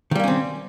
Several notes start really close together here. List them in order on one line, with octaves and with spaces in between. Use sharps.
D#3 G3 A#3 C#4 C4